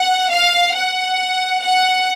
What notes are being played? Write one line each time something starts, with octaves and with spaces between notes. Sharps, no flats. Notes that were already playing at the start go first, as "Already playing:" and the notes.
Already playing: F#5
F5
F#5
F#5